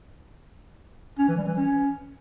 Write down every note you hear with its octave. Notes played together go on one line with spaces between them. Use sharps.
C#4
E3
G3
E3
C#4